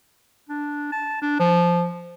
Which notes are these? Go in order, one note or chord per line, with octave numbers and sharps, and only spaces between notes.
D4
A5
D4
F3